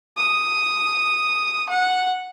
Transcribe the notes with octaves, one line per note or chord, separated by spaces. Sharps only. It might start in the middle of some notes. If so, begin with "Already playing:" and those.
D#6
F#5